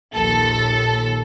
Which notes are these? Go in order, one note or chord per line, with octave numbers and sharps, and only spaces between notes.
A#1 D#2 A4